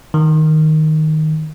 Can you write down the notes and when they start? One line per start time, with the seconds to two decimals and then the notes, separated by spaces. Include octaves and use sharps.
0.14 D#3